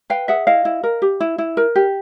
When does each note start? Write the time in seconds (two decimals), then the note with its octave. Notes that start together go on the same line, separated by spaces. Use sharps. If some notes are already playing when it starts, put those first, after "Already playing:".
0.10 B4 F5 G5
0.28 G#4 E5 F#5
0.47 E4 D#5 F5
0.65 E4
0.83 A#4
1.02 G4
1.20 E4
1.38 E4
1.57 A#4
1.75 G4